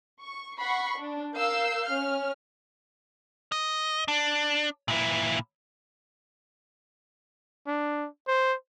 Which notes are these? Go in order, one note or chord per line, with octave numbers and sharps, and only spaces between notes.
C#6
F#5 B5 C#6 C7
D4
A#4 F5 E6 G6 C7
C#4 F6
D#5
D4
A#2 E4
D4
C5